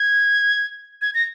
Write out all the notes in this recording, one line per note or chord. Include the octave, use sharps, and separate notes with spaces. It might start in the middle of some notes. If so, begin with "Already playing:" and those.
Already playing: G#6
G#6
A#6